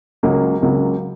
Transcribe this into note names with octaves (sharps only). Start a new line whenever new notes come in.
C#2 C#3 F#3 A#3
C#2 C#3 F#3 A#3